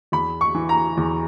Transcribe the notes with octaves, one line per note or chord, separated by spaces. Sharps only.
E2 B5
C#6
E3
A#5
E2